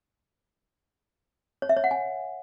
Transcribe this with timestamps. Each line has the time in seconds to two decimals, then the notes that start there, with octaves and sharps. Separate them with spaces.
1.62 C#5
1.69 E5
1.77 C#5
1.84 F#5
1.91 G#5